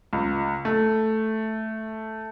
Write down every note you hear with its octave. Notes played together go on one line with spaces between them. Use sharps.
C#2
A3